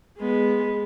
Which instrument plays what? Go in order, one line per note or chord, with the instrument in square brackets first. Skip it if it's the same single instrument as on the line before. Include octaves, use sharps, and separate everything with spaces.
[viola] G#3 B3